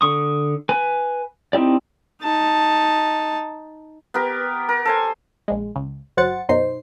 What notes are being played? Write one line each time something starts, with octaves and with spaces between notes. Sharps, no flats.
D3 C#6 D#6
B4 G#5
C4 D#4 E4 G4 D5
D#4 A5
B3 G4 A#4
A#4
A4 C5 G#5
A#1 G#3
C#2
G1 F#3 C5 F#5 A6 C#7
F#2 B2 D#4 C5 C7